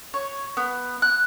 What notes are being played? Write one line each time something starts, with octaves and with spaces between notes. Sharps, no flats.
C#5
B3
F#6